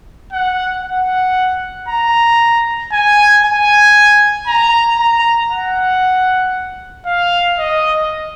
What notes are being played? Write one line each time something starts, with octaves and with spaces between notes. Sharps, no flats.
F#5
F#5
A#5
G#5
G#5
A#5
A#5
F#5
F5
D#5